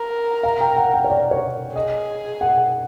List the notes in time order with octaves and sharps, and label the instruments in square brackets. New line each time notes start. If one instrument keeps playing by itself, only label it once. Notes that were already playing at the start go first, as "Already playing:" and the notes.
Already playing: [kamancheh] A#4
[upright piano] F5
G5
F#5
G5
C#5
D5
C#5
[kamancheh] G#4 [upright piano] D#5
[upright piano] F#5